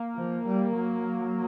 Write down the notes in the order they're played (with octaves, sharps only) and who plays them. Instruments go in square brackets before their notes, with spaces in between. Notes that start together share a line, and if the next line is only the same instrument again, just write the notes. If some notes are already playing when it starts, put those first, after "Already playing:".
Already playing: [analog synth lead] A#3
[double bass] F3
G3
F#3